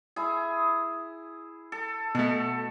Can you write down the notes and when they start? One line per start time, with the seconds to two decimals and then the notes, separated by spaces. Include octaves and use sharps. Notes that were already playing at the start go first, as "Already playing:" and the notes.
0.16 E4 G#4
1.72 A4
2.15 B2 A3 A4